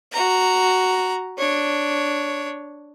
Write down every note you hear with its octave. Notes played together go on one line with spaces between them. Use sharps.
F#4 A#5
D4 C#5